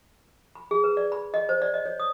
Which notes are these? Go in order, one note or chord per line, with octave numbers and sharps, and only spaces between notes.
B5
G#4
B4
D5
B5
D#5
C5
D5
D#5
C#5
D#6